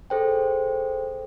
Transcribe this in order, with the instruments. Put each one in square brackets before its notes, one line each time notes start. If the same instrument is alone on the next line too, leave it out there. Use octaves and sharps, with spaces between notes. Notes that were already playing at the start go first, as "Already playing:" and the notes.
[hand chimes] G#4 A4 C5 G5